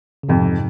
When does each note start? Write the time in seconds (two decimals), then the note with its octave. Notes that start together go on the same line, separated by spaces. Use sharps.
0.23 C#3
0.29 F2 G#2 C3